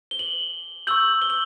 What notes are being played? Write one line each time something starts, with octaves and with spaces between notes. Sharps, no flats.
G7
F#7
C#6 E6 G6 F#7
G7
F#7